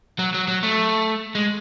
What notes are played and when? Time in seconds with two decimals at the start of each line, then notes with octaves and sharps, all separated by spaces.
0.19 F#3
0.34 F#3
0.48 F#3
0.63 A3
1.35 G#3